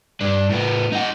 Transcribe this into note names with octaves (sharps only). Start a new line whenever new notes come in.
G2 D4
A2 B3
D#4 F#5